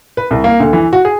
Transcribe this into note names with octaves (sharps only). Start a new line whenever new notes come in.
B4
C2
A#3
D2
E3
F#4
G#4